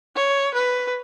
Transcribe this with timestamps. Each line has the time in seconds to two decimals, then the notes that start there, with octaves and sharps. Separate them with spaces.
0.16 C#5
0.55 B4